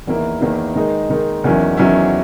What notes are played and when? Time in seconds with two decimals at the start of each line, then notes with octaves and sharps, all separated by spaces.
0.07 E2 D#3 A#3 E4
0.41 E2 D#3 A#3 E4
0.75 D#3 G#3 D#4
1.10 D#3 G#3 D#4
1.44 E2 D#3 F#3 C#4 E4
1.77 E2 D#3 F#3 C#4 E4